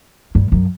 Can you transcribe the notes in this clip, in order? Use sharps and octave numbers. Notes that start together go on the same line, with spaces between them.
G2
F#2